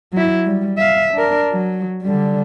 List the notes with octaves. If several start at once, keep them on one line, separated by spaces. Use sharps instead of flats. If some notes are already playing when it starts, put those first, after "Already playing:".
F#3 E4
G3
E5 F5
D4 A#4
F#3
D3 G3